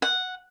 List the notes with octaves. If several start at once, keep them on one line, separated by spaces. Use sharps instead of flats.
F#5